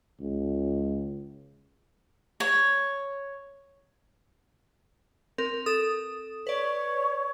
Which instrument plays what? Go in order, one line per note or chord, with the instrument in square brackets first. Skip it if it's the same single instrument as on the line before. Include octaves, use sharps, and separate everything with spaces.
[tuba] C#2
[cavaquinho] C#5
[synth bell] C4 A#4
A4 D#6
[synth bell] B4 D5 [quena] C#5